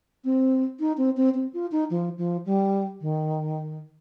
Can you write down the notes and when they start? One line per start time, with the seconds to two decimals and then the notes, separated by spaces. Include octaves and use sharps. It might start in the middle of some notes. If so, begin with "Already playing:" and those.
0.25 C4
0.80 D#4
0.98 C4
1.17 C4
1.34 C4
1.53 F4
1.72 D#4
1.90 F3
2.18 F3
2.46 G3
3.01 D#3